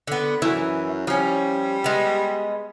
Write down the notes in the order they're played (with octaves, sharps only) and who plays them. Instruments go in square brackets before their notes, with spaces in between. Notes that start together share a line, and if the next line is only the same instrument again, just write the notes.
[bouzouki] D3 B3
[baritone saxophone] F#2 [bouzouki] E3 [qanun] E4
[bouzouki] F3 C#4 [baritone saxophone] G3
[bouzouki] G#3 B3